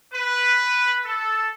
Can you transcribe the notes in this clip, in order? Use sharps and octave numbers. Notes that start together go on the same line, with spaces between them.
B4
A4